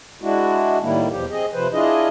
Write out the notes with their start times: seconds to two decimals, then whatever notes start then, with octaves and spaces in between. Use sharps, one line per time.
0.22 G#3 D4 E4 F#4
0.82 A2 D#3 G3 A#3 E4
1.11 E2 B2 F3 G4
1.31 C4 G#4 D#5
1.53 C3 F3 B4 C5
1.73 D4 E4 F4 G#4 D#5